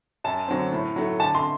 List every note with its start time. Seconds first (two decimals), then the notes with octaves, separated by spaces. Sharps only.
0.24 F#2 A5
0.48 D3 F#3 A3 C4
0.73 A2
0.96 F#3 A3
1.20 D3 A5
1.35 C6